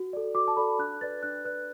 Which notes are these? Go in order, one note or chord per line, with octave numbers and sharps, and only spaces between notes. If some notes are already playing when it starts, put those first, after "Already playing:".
Already playing: F#4
A4 D5
F#4 D6
A5
A4 D5 B5
D4 F#6
B4 D5 A6
D4 F#6
B4 D5 F#6